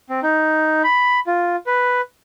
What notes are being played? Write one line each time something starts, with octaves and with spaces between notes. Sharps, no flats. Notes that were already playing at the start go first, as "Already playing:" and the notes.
C4
D#4
B5
F4
B4